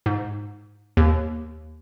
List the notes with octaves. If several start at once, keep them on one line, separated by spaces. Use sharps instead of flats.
G#2
D#2